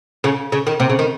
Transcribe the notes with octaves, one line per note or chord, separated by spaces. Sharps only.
C#3
C#3
D#3
C3
C#3
D#3